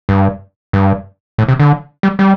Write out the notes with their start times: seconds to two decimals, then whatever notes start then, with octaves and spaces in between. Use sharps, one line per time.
0.09 G2
0.73 G2
1.38 A2
1.48 C3
1.59 D3
2.03 G3
2.19 G3